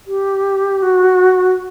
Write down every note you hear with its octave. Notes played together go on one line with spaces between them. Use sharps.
G4
F#4